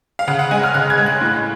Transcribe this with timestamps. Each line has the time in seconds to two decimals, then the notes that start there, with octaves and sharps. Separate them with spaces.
0.19 F5
0.28 C#3 F#5
0.39 F#5
0.51 G#3 G#5
0.63 F6
0.74 C#3 F#6
0.90 G#6
0.98 G#3
1.06 F#6
1.21 A2